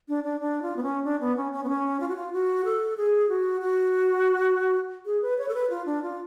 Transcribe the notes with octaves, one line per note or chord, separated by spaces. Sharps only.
D4
D4
D4
F4
B3
C#4
D4
B3
C#4
C#4
B3
C#4
F4
F#4
F4
F#4
A4
G#4
F#4
F#4
G#4
B4
C#5
A4
B4
F4
D4
F4